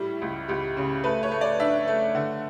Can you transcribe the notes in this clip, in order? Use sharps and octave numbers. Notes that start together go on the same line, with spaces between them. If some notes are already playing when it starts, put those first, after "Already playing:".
Already playing: A2 G3
C#2
C#2 G4
C#3
A3 B4
C#5
A3
D5
D4 E5
A3
D3 F#5